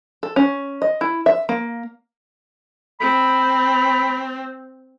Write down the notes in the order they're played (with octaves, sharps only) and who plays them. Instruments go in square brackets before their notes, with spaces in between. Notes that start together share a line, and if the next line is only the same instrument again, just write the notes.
[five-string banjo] A4
C#4
D#5
E4
E5
A#3
[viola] C4 [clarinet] B5